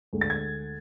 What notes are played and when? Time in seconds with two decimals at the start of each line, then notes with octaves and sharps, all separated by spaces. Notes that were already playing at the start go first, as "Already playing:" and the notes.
0.13 D2 D3 G#3
0.21 A6
0.30 G#6